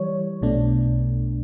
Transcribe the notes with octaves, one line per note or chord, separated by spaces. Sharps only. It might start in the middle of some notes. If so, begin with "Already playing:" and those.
Already playing: E3 G3 C#5
B1 B2 A3 D4